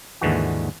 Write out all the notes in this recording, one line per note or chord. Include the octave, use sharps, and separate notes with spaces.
D#2 G#2 D3 E3 F#4